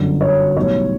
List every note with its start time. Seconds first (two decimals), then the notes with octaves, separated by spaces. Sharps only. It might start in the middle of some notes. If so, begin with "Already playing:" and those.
Already playing: G1 F#2 D3
0.21 C#5
0.56 B1 A2 G3 C#5